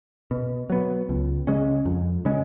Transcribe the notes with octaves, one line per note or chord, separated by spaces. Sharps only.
B2
F#3 B3
C#2
C#3 G#3 C#4
F2
C#3 G#3 C#4